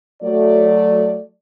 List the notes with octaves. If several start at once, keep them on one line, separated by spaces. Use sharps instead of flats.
F#3 A3 D5